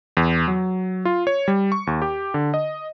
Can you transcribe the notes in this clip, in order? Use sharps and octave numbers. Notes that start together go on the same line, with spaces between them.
E2
F#3
F4
C#5
G3
C#6
D#2
G4
D3
D#5